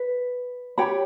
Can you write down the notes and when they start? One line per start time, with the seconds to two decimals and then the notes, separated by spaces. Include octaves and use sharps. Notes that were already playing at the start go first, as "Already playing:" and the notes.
Already playing: B4
0.78 G4 C#5 G5 B5